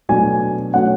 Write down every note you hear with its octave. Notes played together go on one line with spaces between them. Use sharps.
B2 F#3 A3 D4 G#5
B2 F#3 A3 C#4 F#5